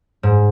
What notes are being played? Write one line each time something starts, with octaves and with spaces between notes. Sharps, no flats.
G#2